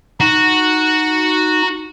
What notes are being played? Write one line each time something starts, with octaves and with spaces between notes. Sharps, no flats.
D#4 F#4